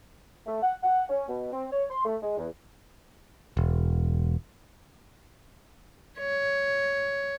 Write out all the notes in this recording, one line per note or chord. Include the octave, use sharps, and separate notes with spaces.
A3
F#5
F#5
C#4
B2
C4
C#5
C6
A3
G#3
E2
E1
C#5